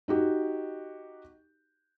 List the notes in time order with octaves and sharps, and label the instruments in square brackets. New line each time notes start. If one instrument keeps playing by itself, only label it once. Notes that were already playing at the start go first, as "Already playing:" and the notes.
[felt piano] D#4 F#4 G4